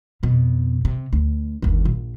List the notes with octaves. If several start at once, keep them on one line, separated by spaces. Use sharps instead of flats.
F2 B2
C3
D2
G1 D#2
A#1